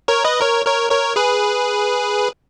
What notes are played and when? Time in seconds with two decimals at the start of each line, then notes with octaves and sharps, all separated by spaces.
0.08 A#4 C#5
0.24 B4 D#5
0.41 A#4 C#5
0.66 A#4 C#5
0.91 A#4 C#5
1.16 G#4 B4